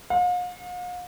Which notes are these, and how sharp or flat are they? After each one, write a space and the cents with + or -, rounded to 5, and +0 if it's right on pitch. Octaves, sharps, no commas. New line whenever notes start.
F5 +45